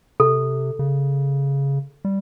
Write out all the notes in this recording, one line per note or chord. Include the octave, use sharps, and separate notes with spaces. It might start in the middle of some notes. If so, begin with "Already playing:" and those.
C3 A4
C#3
G3